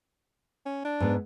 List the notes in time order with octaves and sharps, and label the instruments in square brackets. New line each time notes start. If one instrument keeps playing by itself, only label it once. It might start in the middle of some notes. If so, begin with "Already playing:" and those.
[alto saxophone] C#4
D4
[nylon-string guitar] G#2 B3